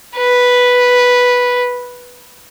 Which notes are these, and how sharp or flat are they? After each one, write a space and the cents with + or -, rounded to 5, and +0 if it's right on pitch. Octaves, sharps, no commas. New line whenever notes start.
B4 -5